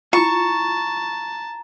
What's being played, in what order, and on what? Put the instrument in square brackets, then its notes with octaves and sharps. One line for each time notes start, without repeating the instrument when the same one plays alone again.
[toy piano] E4 F4 [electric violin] A5 [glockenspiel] A#5 [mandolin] C#6